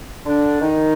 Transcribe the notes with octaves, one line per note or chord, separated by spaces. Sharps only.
D3 D4
D#3 D#4